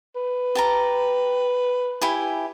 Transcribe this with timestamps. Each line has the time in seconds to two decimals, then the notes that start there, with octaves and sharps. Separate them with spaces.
0.15 B4
0.55 G4 A5 A#5
2.02 E4 G4 G#5